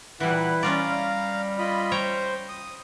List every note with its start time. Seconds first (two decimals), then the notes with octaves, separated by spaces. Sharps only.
0.20 A#2 E3 G3 E4 B4 F#5
0.63 G3 C#4 F4 D5 F5 A#5
1.59 F4 D#5 B5
1.92 C5 C#5 G5 A#5
2.49 D#6